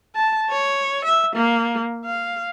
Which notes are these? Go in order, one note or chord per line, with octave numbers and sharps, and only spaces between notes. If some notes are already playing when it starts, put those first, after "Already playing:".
A5
C#5
E5
A#3
F5